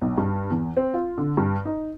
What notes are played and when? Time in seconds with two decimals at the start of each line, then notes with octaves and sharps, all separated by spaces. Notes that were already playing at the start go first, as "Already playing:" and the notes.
0.01 B1
0.18 G2
0.50 E2
0.77 C4
0.94 F4
1.18 D3
1.37 G2
1.65 D#4